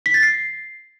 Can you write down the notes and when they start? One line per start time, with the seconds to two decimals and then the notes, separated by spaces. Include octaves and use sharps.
0.06 B6
0.14 A6
0.22 C7